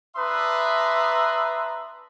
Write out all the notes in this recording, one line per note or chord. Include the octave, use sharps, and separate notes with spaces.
D4 B4 E5 A#5 C6 D#6